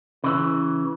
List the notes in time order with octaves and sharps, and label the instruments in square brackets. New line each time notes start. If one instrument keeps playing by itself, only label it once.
[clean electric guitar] C#3 E3